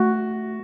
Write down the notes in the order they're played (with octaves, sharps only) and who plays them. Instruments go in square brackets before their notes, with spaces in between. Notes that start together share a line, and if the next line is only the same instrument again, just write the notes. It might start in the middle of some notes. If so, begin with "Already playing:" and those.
Already playing: [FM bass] A3 [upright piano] F#4